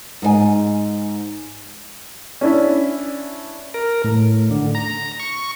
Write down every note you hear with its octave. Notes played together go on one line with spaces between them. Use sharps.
G#2 B4 G#5
C#4 D4 E4
A#4
A2
D3
A#5
C#6